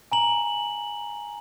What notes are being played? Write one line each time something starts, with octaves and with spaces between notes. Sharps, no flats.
G#5 A#5 F#7